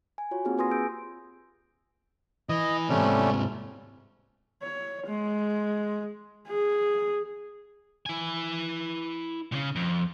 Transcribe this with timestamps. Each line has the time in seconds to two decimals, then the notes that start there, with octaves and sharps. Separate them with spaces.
0.18 G#5
0.31 F4 F#4 C#5
0.45 A#3 C4 D#4 F4 G4 G#4
0.58 F4 B4 G#5 C6 D#6 A#6
0.71 G#4 E6 G6 D7
2.49 E3 D#5
2.89 G#2 C3 G3 A3 C#4
4.62 C#5
5.07 G#3
6.48 G#4
8.06 E4 G#5
9.52 A#2 C#3
9.76 F2